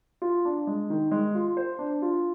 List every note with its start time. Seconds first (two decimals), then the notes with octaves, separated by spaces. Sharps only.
0.22 F4
0.45 D4
0.67 G#3
0.90 D#3
1.11 G#3
1.35 F4
1.57 C5
1.79 D4
2.02 F4